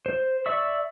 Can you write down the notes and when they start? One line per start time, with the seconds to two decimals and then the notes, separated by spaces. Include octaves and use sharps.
0.06 C5
0.46 D5 E5 C#6 E6